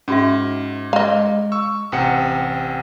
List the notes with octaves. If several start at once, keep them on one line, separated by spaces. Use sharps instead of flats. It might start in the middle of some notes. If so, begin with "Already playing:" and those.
G#2 C#4 F#4 E5
G#3 D#5 F5 A#5
C#6 E6
A1 C3 F#5 G5 D#6 C#7